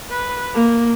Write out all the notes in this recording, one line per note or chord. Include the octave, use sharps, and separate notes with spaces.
B4
A#3